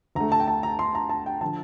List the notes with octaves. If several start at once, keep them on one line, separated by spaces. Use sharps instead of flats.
D2 D3 A3 A#5
A5
G5
A5
A#5
C6
A#5
A5
G5
D3 F3 A5